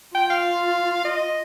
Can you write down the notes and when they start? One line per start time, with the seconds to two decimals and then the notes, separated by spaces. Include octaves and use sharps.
0.15 F4 G5
0.30 F5
1.05 D#5